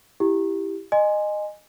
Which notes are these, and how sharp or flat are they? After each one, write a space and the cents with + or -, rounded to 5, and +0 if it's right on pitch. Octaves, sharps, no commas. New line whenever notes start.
E4 +0 G4 +0
D#5 -20 G#5 +0 C6 +0